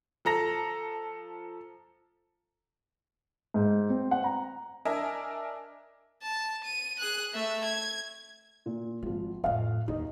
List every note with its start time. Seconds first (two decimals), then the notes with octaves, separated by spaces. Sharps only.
0.25 F3 A4 A#5 A#6
3.54 G#2
3.90 C4
4.11 F#5
4.24 A#5
4.85 D4 A#4 D#5 E5 G#5
6.23 A5
6.64 D#7
6.99 G#4 F#6
7.33 A3 E5
7.65 G#6
8.66 A#2
9.03 G#1 E3 F3
9.44 F2 A2 D#5 F5 F#5
9.88 D#2 D#4 D#5